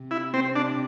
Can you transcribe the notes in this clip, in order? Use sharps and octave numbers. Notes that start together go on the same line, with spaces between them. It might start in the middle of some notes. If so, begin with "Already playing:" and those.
Already playing: C3
E4
C4
D4